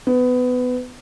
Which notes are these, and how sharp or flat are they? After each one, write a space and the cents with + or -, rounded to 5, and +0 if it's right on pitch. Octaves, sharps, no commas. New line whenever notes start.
B3 +20